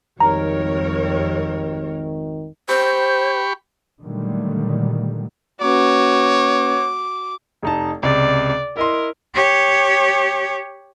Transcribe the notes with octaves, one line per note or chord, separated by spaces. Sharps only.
G#1 F2 D#3 G3 A#4 C#5 A#5
G4 C5 B5 C#6
A#2 D3 D#3 F#3 G3 A3
A#3 C#4 F#4 B4 C#5 D6
F1 D#4 A5
C#2 C3 D5
E4 A#4 D#5 C6
G4 C#5